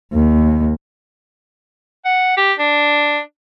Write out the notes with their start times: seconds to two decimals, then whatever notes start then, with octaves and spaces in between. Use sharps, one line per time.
0.12 D#2
2.05 F#5
2.37 G4
2.59 D4